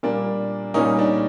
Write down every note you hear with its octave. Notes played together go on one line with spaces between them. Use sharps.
A#2 G3 A#3 D4
A#2 G3 A#3 C#4 D#4
D4